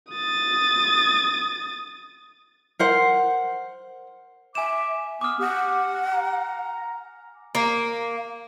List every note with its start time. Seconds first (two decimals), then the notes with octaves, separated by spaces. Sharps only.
0.12 D#6 A6
2.79 A#4 C5 F#5
4.55 E5 G#5 D6 E7
5.21 B3 D6 D#6 F6
5.39 G4 F#5
6.12 A#5
7.55 A#3